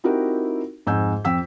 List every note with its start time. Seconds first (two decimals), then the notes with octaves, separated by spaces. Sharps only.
0.04 C4 D#4 E4 F#4 G4 A#4
0.86 F2 G#2 G#5 E6 G6
1.25 F2 G5 E6 B6